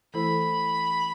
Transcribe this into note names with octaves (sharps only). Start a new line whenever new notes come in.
E3 A3 E4 A4 C5 B5